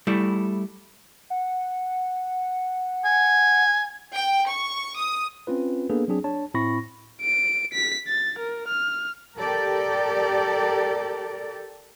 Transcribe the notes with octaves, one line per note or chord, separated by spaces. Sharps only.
G3 A3 E4
F#5
G#5
G5
C#6
D#6
C4 C#4 F4 B4
A#3 B3 D4 G#4 A4 B4
F#3 C4 D4 G#4
D4 C#5 A5
A2 C4 E4 B5 C#6 A#6
D7
B6
A6
A#4
F6
G4 A4 A#4 D5